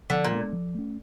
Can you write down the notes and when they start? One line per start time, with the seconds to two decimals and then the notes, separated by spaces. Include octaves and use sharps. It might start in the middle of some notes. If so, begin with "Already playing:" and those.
0.10 D3 F3
0.24 A#2
0.32 G#3 B3 D4
0.53 F3
0.75 A3 C#4